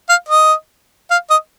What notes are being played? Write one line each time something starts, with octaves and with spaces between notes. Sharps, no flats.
F5
D#5
F5
D#5